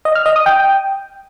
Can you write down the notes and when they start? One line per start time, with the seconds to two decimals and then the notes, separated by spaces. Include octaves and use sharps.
0.05 D#5
0.15 F6
0.26 D#5
0.36 D#6
0.46 G5